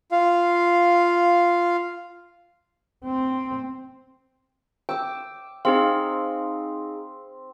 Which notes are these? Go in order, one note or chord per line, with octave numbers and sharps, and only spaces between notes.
F4 F5
C4
G5 D6 E6
C4 D#4 G#4 F5